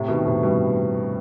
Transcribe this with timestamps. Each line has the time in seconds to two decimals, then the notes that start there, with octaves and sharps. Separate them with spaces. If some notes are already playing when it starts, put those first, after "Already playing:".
Already playing: A2 C3
0.08 B2 D#3
0.25 A2 C3
0.43 G2 B2